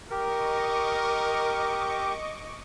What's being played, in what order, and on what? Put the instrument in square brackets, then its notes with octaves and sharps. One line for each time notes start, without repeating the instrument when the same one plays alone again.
[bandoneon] G4 [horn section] A#4 [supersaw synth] D#5 C#6 D6